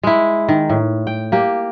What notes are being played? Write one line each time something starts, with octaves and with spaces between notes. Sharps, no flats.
G#3 E4
D#3
A2
G5
A#3 G4